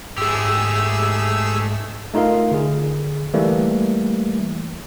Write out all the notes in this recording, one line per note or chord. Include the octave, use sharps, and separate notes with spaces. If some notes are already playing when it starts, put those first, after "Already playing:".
G#2 A3 G4 G#4 C6 E6
A3 D#4 F4 A#4 F5
D3 G#4
E3 G3 A3 A#3